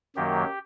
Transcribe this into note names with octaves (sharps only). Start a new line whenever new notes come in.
F#2 D#3 F#3 A#3 G4